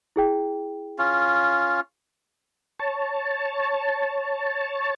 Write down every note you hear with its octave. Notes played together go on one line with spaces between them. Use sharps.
E4 G#4 G5
C#4 F4
C#5 A5